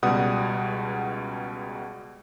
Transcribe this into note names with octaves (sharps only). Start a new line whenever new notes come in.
C#2 B2 G3 F#5 D#6